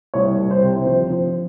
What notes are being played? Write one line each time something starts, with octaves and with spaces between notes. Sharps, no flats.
C2 C#5
C2
C5
C3
F3 C5
F3